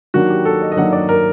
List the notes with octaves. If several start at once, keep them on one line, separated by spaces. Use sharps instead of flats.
D#3 F#3 A#3 D4 F#4
G4
A4
D#5
D#5
D#3 F#3 A#3 D4 F#5
D5
A#4